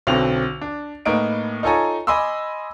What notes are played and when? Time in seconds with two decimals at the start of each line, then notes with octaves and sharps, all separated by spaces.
0.07 B1 B2 D3 C4 F7
0.61 D4
1.05 A2 A#3 B3 D#4 D7
1.63 D#4 F4 A4 C#5 G#5 A#5
2.07 D#5 G#5 B5 C6 D6 E6